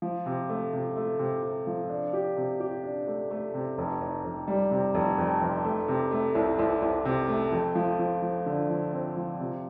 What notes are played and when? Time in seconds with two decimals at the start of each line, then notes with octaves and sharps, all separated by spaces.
0.02 F3
0.26 C3
0.49 A3
0.73 C3
0.97 A3
1.19 C3
1.43 C3
1.67 F3
1.89 D4
2.13 G4
2.37 C3
2.60 G4
2.83 D4
3.07 A3
3.31 A3
3.54 C3
3.78 F1
4.01 F1
4.24 F1
4.48 G3
4.71 C3
4.94 F1
5.18 F2
5.42 F1
5.65 A3
5.88 C3
6.11 A3
6.35 C2
6.59 C2
6.82 C2
7.05 C3
7.28 A3
7.52 F2
7.75 F3
8.00 F3
8.22 F3
8.46 D3
8.69 F3
8.93 C4
9.16 F3
9.39 C3